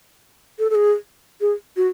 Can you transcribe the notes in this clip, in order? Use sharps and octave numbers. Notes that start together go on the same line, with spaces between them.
A4
A4
G#4
G#4
F#4